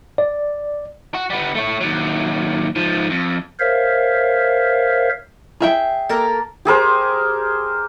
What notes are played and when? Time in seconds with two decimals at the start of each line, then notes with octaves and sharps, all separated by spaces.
0.18 D5
1.14 F#4
1.30 G3 B3
1.55 A3 C#5
1.81 D#2 F#3
2.76 G#2 F3
3.10 F2
3.60 A#4 C5 C#5 E5 F5
5.60 G#4 E5 G5
6.09 A#3 A4 A#4
6.65 G4 G#4 A#4 C5